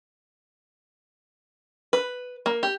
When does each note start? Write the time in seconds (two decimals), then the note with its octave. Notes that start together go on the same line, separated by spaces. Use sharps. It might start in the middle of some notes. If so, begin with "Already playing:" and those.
1.93 B4
2.46 A#3
2.63 G4